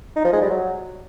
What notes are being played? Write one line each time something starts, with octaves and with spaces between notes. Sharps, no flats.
D#4
F3
G#3
G3
F#3